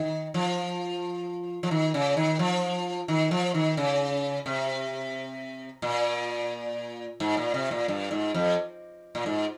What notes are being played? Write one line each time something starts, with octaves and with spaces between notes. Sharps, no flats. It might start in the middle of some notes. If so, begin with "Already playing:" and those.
Already playing: D#3
F3
F3
D#3
C#3
D#3
F3
D#3
F3
D#3
C#3
C3
A#2
G#2
A#2
C3
A#2
G2
G#2
F2
A#2
G#2